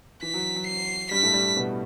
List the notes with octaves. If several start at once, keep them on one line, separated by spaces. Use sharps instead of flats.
E3 B6
F#3
F#3
C7
G2 G3 B6
A2 A3
G2 G3
B2 B3